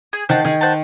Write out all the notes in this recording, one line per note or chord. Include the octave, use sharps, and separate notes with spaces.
G#4
D#3 C5 F#5 A5
D#3 G#4
C5 F#5 A5